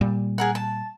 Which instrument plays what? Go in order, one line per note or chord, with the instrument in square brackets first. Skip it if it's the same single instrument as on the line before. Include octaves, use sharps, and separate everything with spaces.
[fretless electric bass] A#2 G3
[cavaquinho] G#4 A#4 F#5
A5